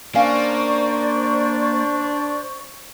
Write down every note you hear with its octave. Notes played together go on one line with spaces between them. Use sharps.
A#3 C#4 D4 C5 D5 F5 C#6